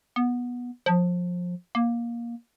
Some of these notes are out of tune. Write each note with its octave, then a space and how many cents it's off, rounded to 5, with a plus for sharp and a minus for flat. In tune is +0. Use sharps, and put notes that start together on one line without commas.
B3 -15
F3 +25
A#3 +15